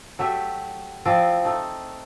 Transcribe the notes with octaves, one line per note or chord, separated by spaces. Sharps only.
F#3 A3 G4 E5
F3 C4 E4 D5
A3 D#4